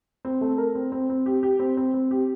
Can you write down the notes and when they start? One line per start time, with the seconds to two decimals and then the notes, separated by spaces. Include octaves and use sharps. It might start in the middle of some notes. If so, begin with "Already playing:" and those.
0.25 C4
0.41 A3
0.58 A#4
0.75 C4
0.92 C4
1.09 C4
1.26 G4
1.43 G4
1.59 C4
1.77 C4
1.94 C4
2.11 G4